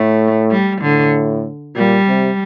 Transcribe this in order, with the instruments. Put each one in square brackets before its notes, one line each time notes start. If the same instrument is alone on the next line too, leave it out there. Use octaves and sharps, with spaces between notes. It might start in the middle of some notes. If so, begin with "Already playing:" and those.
Already playing: [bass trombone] A2 [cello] A3
[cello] G3
[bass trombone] A2 [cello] D3
[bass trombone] A#2 [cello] G3
[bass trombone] C3